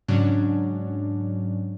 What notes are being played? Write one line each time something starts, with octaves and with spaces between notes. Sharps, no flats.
G#2 C#3 F#3 C#4 D4